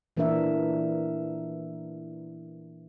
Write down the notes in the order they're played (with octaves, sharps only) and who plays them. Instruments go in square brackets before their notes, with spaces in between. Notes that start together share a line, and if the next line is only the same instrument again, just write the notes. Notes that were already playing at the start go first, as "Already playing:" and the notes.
[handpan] A#2 E3 A#3 D4 A#4 E5